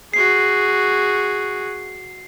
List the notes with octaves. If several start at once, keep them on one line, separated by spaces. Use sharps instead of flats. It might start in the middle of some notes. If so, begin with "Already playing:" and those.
F#4 G#4 C7